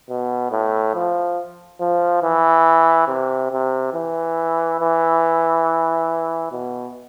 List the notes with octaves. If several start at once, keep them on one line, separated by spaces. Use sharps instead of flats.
B2
A2
F3
F3
E3
C3
C3
E3
E3
B2